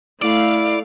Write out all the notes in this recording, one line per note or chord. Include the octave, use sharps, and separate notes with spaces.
A3 E4 D5 F5